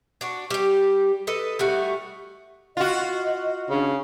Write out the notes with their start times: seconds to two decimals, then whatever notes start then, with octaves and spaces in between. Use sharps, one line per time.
0.21 D4 F#4
0.50 G3 G4
1.27 A4 B4 D#5
1.59 G3 A3 F#4
2.77 F4 F#4 D#5
3.70 C#3 D4